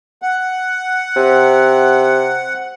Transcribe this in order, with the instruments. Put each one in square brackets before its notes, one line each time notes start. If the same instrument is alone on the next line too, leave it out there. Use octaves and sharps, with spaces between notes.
[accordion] F#5
[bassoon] C3